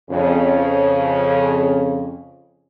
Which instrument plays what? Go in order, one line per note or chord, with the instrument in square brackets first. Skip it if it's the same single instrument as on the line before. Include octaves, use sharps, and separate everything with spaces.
[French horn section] F2 C#3